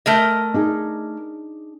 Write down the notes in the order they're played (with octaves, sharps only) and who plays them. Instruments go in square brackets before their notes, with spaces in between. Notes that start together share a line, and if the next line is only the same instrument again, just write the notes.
[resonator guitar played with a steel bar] A3 A#4 D#5
[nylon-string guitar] D4 D#4 G#4